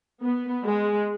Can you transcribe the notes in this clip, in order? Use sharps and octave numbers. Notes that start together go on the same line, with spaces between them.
B3
G#3